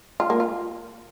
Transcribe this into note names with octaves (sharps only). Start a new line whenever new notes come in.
F4
A#3
F4